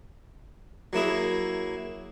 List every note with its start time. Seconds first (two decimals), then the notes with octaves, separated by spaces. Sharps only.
0.93 F#3 A#3 E4 G#4